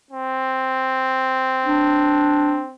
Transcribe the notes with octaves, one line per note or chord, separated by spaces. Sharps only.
C4
D4